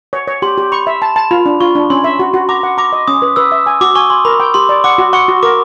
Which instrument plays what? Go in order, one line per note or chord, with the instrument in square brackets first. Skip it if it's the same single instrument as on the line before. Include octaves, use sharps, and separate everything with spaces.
[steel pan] C#5
C#5
[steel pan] G4 [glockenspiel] C6
[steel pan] G4
[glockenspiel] B5 [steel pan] C#6
[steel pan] E5
A5
A5
[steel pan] F4 [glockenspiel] B5
[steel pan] D4
[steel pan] F4 [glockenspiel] C#6
[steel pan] D4
[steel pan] C#4 [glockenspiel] C6
[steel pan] E5
F#4
F#4
[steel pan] A#5 [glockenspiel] D6
[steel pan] F#5
[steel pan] A#5 [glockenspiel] D6
[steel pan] D#5
[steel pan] C#4 [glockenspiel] D#6
[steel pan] B4
[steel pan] B4 [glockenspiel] E6
[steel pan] E5
G#5
[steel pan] F#4 [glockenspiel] D6
[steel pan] G#5 [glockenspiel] C#6
[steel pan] G#5 [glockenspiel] C6
[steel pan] A#4 [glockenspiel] B5
[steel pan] G5
[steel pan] G4 [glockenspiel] C6
[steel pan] D5
[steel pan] F#5 [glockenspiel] D6
[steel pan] F#4
[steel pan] F#5 [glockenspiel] C#6
[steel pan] F#4
[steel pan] A#4 [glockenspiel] D6